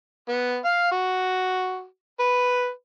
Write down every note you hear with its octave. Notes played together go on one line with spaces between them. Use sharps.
B3
F5
F#4
B4